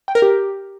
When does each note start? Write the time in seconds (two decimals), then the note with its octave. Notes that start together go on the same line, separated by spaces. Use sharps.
0.08 G5
0.15 A#4
0.22 G4